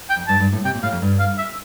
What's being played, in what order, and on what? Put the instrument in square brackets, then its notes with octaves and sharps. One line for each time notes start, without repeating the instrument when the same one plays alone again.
[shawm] G5
[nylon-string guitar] F2
[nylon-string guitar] G2 [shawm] A5
[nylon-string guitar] G2
A2
[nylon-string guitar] C3 [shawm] G5
[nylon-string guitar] A#2
[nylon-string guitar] A2 [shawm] F5
[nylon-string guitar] F2
G2
[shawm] F5
E5